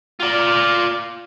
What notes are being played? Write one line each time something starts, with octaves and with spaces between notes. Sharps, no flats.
F4 D5